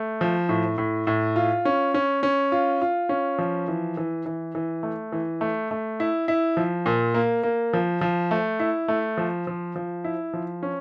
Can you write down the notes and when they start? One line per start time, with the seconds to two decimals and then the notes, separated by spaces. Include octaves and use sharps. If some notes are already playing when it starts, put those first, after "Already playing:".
Already playing: A3
0.21 F3
0.49 A2
0.78 A2
1.07 A2
1.36 F4
1.65 C#4
1.94 C#4
2.23 C#4
2.52 F4
2.82 F4
3.09 C#4
3.38 F3
3.68 E3
3.97 E3
4.26 E3
4.55 E3
4.83 A3
5.12 E3
5.41 A3
5.71 A3
6.00 E4
6.28 E4
6.57 F3
6.86 A#2
7.14 A#3
7.43 A#3
7.73 F3
8.01 F3
8.31 A3
8.60 E4
8.88 A3
9.17 F3
9.47 F3
9.76 F3
10.04 E4
10.34 F3
10.63 C#4